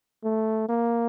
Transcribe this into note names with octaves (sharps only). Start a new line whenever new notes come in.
A3
A#3